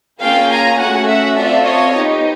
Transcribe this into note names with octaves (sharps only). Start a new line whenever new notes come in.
A#3 C#4 F4 G#4 F5 G5
G#5 A#5
A3 C#4 F#4 F#5 G#5
E5 F#5
C4 F4 A4 D5 E5
C#5 D#5
B3 D#4 G4